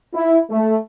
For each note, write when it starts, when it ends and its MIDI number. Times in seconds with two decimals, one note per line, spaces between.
0.14 0.38 64
0.51 0.77 57